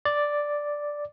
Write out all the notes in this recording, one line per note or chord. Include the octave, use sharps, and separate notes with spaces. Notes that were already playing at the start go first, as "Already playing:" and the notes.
D5